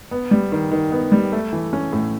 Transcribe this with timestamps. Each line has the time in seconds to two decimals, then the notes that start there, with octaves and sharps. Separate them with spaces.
0.11 B3
0.31 G3
0.52 D#3
0.72 D#3
0.92 B3
1.12 G3
1.32 A3
1.53 E3
1.73 C#4
1.93 A2